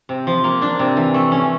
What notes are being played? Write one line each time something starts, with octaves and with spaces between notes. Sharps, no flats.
C3
F3
A#3
D4
C3
E3
A3
C#4